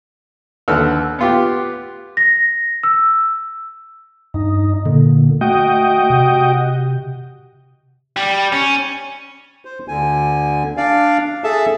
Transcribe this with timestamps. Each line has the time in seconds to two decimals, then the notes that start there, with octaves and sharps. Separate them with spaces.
0.68 D#2 D3 B4 F#5 E6 F6
1.19 B3 F4 G4
2.17 A#6
2.83 E6
4.34 G2 D#4
4.85 A#2 D3
5.41 A3 F#4 D#5 G5
6.10 C3
8.17 G3
8.53 C#4
9.65 C5
9.88 D2 D3 G#5
10.77 D4 D5 F5
11.44 G#4 A4 E5 A5